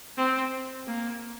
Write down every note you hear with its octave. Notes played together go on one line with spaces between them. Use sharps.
C4
A#3